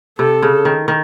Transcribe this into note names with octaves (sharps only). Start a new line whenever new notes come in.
C3 A4
C#3
D#3
D#3